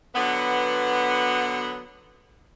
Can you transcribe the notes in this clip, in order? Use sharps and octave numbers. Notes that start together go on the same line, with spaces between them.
D3 F#3 B3